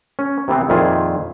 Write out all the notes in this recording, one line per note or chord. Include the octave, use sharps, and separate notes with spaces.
C#4
C3 E3 B3 C4
F2 A#2 D#3 E4 F4 G#4